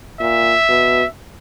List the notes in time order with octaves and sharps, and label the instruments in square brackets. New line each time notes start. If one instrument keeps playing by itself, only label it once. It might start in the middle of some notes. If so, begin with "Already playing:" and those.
[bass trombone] A#2 [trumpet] E5
[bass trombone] B2